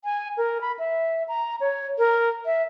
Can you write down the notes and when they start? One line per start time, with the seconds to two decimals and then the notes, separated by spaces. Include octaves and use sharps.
0.04 G#5
0.37 A#4
0.61 B5
0.79 E5
1.28 A#5
1.60 C#5
1.98 A#4
2.46 E5